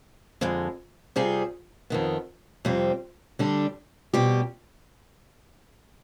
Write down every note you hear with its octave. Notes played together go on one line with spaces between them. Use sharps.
F2 D3 G#3
C3 G3 C4 F4 G#4
F2 D#3 B3
F2 C3 G3 C4
D3 G3 D4 G4
B2 G3 C4 G4